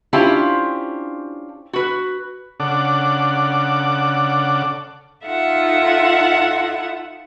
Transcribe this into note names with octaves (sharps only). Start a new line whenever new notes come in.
C#4 D4 E4 F4 G4 C5
F#4 B4
C#3 D4 A4 F#5 D6
D#4 F4 A4 E5 F#5